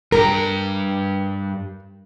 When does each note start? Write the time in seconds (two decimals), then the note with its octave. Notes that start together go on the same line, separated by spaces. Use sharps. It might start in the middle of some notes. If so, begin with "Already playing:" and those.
0.12 G2 G4 A#4